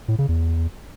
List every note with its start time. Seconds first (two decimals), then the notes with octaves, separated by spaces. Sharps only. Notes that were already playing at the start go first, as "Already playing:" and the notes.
0.08 A2
0.18 C#3
0.29 E2